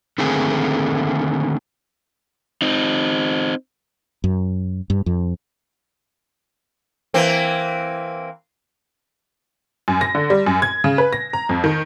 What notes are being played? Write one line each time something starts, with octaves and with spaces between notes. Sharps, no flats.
D3 D#3 A3 A#3 C4 G#4
C4 D#4
F#2
G2
F2
E3 A#3 C4
F#2
A#6
D3
G3
F#2
G#6
C#3
B4
A#6
A#5
F2
D#3